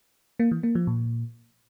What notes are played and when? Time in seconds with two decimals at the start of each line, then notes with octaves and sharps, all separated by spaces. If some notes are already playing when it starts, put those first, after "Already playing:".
0.39 A#3
0.51 E3
0.63 A#3
0.75 F3
0.87 A#2